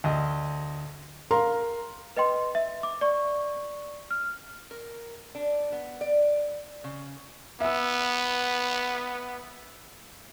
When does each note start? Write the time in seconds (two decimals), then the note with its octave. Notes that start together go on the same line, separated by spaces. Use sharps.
0.04 D2 D#5
1.31 A#4 F5 A#5 C6
2.17 B4 D#5 G5 C6
2.55 E5
2.83 D6
3.01 D5 C#6
4.11 F6
4.71 A#4
5.35 D4
5.72 B3
6.01 D5
6.84 C#3
7.61 B3 E5 E6